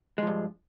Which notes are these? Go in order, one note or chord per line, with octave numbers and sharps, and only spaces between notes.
G2 F3 G#3